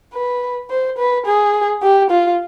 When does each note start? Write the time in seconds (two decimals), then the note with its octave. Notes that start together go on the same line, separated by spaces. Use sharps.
0.14 B4
0.70 C5
0.99 B4
1.26 G#4
1.83 G4
2.11 F4